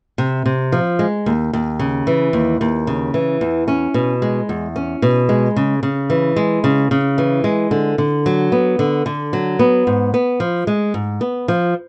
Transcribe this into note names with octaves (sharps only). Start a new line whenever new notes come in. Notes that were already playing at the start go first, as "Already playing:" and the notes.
C3
C3
F3
G#3
D#2
D#2
C#3
E3
D#2
D#2
C#3
E3
E2
C#4
B2
G#3
E2
C#4
B2
G#3
C#3
C#3
E3
G#3
C#3
C#3
E3
G#3
D3
D3
F#3
B3
D3
D3
F#3
B3
G#2
B3
F3
G#3
G#2
B3
F3